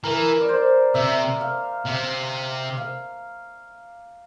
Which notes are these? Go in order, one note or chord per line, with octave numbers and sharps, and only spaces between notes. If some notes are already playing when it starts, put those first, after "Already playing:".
E3 A#4
D5
C5
C3 E5
F5
C3
F5